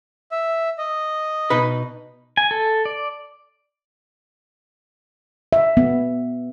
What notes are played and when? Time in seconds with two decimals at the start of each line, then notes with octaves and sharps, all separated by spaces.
0.32 E5
0.78 D#5
1.50 B2 D#4 B4
2.37 G#5
2.51 A4
2.85 D5
5.53 E5
5.77 B3